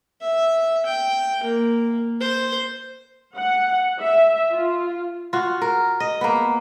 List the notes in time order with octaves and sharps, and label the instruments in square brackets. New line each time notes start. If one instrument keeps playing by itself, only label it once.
[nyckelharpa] E5
G5
A#3
C5
[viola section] F#5
E5
F4
[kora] F4 F#4
A#4
D#5
A#3 B3